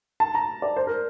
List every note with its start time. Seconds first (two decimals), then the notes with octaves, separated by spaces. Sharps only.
0.20 A5
0.35 A#5
0.62 D5
0.77 C5
0.87 A#4